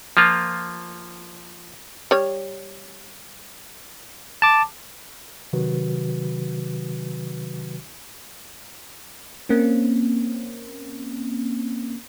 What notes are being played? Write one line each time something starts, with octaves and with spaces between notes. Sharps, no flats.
F3 A#3 F4
G3 C#5
A5 D6
C3 D#3 F#3 F#4 B4
A#3 C4 C#4